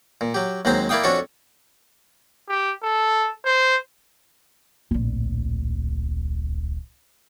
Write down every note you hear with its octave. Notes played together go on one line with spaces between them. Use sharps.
A#2
F#3 G4
D#2 F#3 G#3 C4 C5 A#5
A#3 E4 D5 F5 G5 D#6
F2 C#4 D4 F#4 A4 C#5
G4
A4
C5
D1 A#1